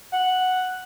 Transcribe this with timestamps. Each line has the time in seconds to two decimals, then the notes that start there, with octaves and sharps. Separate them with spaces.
0.13 F#5